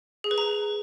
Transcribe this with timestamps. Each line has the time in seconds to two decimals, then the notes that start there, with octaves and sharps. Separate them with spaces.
0.24 G#4
0.31 B4
0.38 A#5